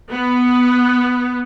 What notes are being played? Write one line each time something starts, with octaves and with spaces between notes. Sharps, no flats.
B3